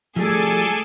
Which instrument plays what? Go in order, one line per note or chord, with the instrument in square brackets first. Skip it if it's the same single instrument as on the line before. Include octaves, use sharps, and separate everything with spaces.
[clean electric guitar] F3 G3 A3 [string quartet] G#4 [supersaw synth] A4 G#5 D6